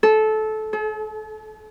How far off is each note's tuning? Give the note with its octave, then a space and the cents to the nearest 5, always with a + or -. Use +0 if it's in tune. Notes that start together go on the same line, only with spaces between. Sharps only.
A4 -20
A4 -45